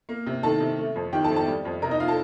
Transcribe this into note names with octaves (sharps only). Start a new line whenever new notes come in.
A#3
C3
D#3 A4 A5
C3
A3
F2
D#3 G4 G5
A4 A5
F2
A4 A5
G3
F2
C3 A#4 A#5
D#4 D#5
F4 F5
A4 A5